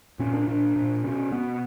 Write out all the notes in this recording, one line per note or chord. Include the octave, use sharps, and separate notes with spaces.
A#2 C#4
D4
A#2 D4
A#2
B2 C#4
B2 B3